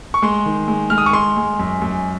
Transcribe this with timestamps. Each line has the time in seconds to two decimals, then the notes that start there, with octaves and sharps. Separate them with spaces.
0.14 C#6
0.22 G#3 C6
0.46 D#3
0.68 G#3
0.90 G#3 F6
0.98 D#6
1.06 C#6
1.13 G#3 C6
1.37 G#3
1.59 F#2
1.82 F#2